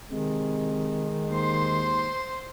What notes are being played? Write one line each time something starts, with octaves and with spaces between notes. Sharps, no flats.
C3 D#3 G#3
D#2 C5 C6